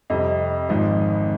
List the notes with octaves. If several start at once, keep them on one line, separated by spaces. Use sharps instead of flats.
F2 C3 G3 D#5
G#1 G#2 F3 D#5